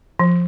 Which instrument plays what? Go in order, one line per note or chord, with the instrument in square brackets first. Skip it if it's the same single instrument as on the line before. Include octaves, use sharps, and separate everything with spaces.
[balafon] F3